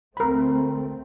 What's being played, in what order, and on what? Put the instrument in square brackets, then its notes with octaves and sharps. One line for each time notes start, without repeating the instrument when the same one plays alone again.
[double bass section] D2 A3 C4 [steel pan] A#4 B5